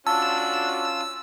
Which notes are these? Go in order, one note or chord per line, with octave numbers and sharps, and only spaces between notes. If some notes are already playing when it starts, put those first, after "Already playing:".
C#4 D4 F4 F#4 A5 E6